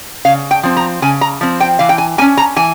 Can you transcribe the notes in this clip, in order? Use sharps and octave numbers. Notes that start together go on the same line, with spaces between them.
C#3 F5
G5
F3 C4
A#5
C#3 G#5
A#5
F3 C4
G5
E3 F5
G5
G#5
A#3 G#5
C#4
A#5
E3 G#5